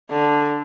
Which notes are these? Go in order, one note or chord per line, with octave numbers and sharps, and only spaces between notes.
D3